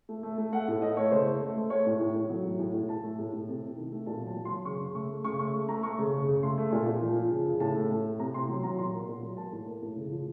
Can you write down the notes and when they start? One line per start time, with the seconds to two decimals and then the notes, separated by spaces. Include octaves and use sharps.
0.09 A3
0.23 A3
0.38 A3
0.53 A3 F#5
0.68 A2
0.82 A3 D#5
0.97 A3 C#5
1.11 C#3 C5
1.26 A3
1.41 A3
1.56 A3
1.70 A3 C#5
1.86 A2
2.00 A2
2.15 A2
2.30 F#3
2.44 A2
2.59 A2
2.74 A2
2.88 A2 A5
3.03 A3
3.19 A2
3.33 A2
3.48 C3
3.63 C3
3.77 D#3
3.92 A3
4.06 A#2 A5
4.21 F#3
4.27 A5
4.36 F#3
4.45 C6
4.51 F#3
4.65 C#3 C#6
4.80 C#3
4.95 A3 C#6
5.09 A3
5.24 C#3 C#6
5.39 A3 C#6
5.54 A3
5.69 A3 A#5
5.83 A3 C#6
5.98 C#3
6.13 C#3
6.28 C#3
6.42 A3 C6
6.58 A3
6.72 A#2
6.86 A#2
7.01 F3
7.16 F3
7.31 C#3
7.46 C#3
7.60 A2 A5
7.75 A3
7.90 A2
8.05 A3
8.19 C3 A#5
8.34 C3 C6
8.49 F#3
8.63 F#3 A#5
8.78 A#2 C6
8.93 A#3
9.08 A#2
9.22 F#3
9.37 A#3 A5
9.52 A2
9.67 A#3
9.82 A2
9.96 C#3
10.11 F3